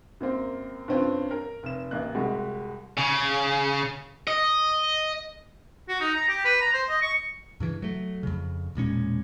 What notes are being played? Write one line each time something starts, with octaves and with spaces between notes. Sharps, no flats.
F#2 A#3 C4
G2 C#3 C4 C#4 F4
A#4
F1 E7
A1 A#3 D#5 F#6
C2 G3 G#3 F#4
C#3
D#5
F#4
D#4
A#5
G4
B4
A#5
C5
D#5
C#6
G2 C#3 E3
F#3 A3
F2 C#3
E1 A#2 G#3 C#4